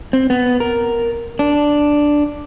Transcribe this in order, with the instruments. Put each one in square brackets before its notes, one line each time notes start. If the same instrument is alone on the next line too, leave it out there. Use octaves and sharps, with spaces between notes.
[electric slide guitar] C4
B3
A#4
D4